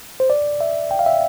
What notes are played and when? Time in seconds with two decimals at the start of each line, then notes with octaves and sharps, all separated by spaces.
0.20 C5
0.30 D5
0.61 E5
0.91 G5
0.99 F5
1.06 E5